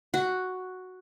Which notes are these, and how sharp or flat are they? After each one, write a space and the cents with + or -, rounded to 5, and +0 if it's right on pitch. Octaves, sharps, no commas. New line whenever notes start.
F#4 +0